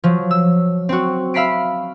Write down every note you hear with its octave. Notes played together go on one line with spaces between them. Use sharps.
F3 F#3
E6
C4 F#4
E5 F5 B5 B6 C7 D7